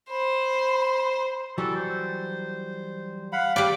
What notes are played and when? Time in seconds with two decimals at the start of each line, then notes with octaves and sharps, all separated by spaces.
0.10 C5 B5
1.58 E3 F#3 G3 A4
1.76 C5
3.33 F5 F#5 B5
3.56 G3 D5 F5 G5 B5